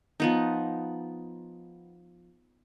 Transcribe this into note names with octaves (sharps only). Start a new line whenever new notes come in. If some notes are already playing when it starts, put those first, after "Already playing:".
F3 B3 D#4